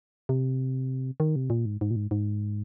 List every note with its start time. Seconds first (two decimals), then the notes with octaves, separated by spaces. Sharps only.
0.29 C3
1.20 D#3
1.36 C3
1.50 A#2
1.66 G#2
1.81 G#2
1.91 A#2
1.96 G#2
2.11 G#2